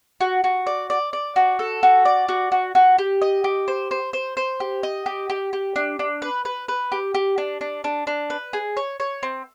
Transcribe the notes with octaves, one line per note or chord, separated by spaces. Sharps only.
F#4
F#4
D5
D5
D5
F#4
A4
F#4
D5
F#4
F#4
F#4
G4
D#5
G4
C5
C5
C5
C5
G4
D#5
G4
G4
G4
D4
D4
B4
B4
B4
G4
G4
D4
D4
D4
D4
B4
G#4
C#5
C#5
C4